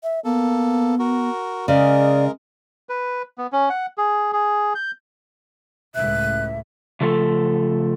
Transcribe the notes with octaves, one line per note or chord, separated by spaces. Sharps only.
E5
A#3 B3 A4
F#4 A#4
C#3 G#3 A#4 D5
B4
B3
C#4
F#5
G#4
G#4
G6
C#2 A2 E5 F#6
C#3 F3 A3 A4